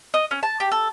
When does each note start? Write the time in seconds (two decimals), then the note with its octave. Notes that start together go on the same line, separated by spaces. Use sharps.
0.14 D#5
0.31 C#4
0.43 A5
0.60 G4
0.72 A4